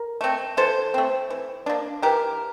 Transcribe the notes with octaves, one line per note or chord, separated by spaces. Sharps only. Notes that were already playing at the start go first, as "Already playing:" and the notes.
Already playing: A#4
A3 C4
E3 A4 C5
A3 C4
E3
A#3 D4
E3 G4 A#4